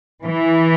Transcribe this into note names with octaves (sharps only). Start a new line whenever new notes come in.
E3